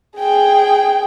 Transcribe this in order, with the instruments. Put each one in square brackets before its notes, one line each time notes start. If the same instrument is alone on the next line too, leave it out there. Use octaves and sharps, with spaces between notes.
[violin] G#4 G5